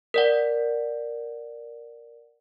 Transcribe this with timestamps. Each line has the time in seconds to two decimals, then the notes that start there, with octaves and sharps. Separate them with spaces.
0.14 A#4 D5 F#5